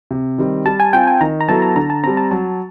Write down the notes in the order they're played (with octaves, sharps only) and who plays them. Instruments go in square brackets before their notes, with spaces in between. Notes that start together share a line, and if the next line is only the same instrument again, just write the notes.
[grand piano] C3
D#3 G3 C4
[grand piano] G3 [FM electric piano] A5
[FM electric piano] G#5
[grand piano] C4 F4 [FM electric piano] G5
[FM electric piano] G#5
[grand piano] D#3 [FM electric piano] A#5
[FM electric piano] A#5
[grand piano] F#3 B3 E4 A4 [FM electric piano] A5
[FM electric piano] A#5
[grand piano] D3 [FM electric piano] A#5
[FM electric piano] A5
[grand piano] C4 [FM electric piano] A#5
[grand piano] G3
[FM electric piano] A5
[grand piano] F#3 [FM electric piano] A5